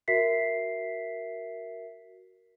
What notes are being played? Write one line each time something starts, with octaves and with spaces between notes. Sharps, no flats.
F#4 A#4 E5 B6 C7